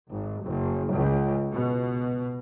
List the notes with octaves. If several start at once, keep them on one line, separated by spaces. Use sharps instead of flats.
G#1
F#1
C#2
B2